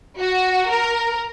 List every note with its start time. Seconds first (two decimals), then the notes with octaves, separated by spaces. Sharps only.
0.19 F#4
0.70 A#4